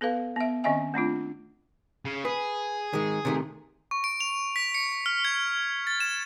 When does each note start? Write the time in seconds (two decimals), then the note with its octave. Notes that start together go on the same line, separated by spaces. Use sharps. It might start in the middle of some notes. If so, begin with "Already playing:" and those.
0.01 B3 A4 B4 F5
0.36 B3 E5
0.64 D#3 C4 C#4 D#5 E5 G#5
0.94 A3 C4 D4 F4
2.05 C#3
2.25 G#4 B4
2.93 D#3 G#3
3.25 C3 D#3 A3
3.91 C#6
4.04 D7
4.20 F7
4.56 B6
4.74 C#7
5.06 F6
5.25 G#6
5.87 A6
6.00 E7